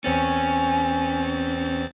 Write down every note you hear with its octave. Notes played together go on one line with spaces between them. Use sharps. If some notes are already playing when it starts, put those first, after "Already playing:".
E2 C4 C#4 G#5 A6